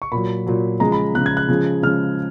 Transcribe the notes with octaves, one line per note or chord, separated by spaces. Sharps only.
C#6
A#2 F#3 B5
A#2 F#3
C#3 F3 G#3 A#5
B5
C#3 F3 G#3 F#6
G#6
F#6
C#3 F3 G#3
C#3 F3 G#3 F6